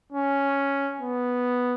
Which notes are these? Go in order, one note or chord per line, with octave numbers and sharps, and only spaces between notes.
C#4
B3